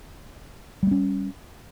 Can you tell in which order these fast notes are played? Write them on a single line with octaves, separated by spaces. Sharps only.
G3 A3 C#4